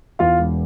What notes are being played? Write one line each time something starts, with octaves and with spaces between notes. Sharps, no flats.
E2 F4 F5
E1